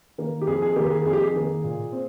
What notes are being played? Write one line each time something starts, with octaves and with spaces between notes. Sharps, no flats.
D#3 A#3
G4
F2 G#4
G#4
D#3 A#3 G4
G#4
F2 G#4
G4
G#4
D#3 A#3
A#2
C4